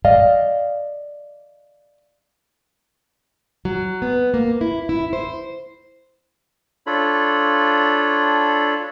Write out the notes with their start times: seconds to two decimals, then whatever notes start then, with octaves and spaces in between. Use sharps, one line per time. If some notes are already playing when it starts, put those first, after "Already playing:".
0.05 D5 D#5 F5
3.65 F#3
4.02 B3
4.34 A#3
4.61 E4
4.89 E4
5.13 C5
6.87 D4 F4 A4 C#5 B5